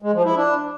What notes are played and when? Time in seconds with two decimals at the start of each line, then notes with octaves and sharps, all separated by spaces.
0.02 G#3
0.13 F3
0.25 E4
0.36 D4